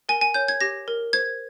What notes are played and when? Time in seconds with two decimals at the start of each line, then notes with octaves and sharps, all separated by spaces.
0.09 A#4 G#5
0.21 G#5
0.34 C#5 G6
0.48 G#6
0.61 G4 A#6
0.88 A#4
1.13 C5 G#6